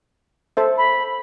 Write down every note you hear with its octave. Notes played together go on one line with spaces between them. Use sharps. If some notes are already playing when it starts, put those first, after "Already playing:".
A4 C5 E5
B5